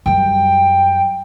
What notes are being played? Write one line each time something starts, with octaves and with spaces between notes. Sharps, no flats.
F#2 G3 G5